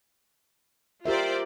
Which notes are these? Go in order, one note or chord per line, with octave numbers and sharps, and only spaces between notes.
F4 G4 A#4 C5 D5 E5